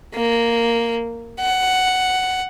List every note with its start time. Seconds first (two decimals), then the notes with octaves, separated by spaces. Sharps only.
0.14 A#3
1.40 F#5